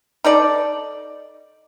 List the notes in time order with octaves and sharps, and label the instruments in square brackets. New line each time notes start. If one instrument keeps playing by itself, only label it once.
[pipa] D#4 A4 D5